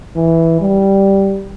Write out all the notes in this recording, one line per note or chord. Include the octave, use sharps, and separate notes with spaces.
E3
G3